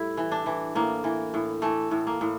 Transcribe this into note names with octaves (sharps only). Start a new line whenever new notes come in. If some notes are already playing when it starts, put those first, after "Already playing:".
Already playing: A2 G3 E4
E3
D4
E3
A2 A#3
E3
A2
E3 A3
A2
A#3
A2